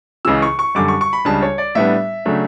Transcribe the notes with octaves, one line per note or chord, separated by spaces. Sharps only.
C#2 C#3 E3 E6
C#6
C#6
F#2 D3 G3 D6
C#6
C#6
B5
C#2 C#3 G3 D4 A5
C#5
D5
A2 G3 B3 D4 E5
C#3 F#3 A3 D4